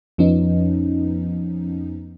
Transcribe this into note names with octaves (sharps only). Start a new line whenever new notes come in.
F2 F3 B3 C#4 D#4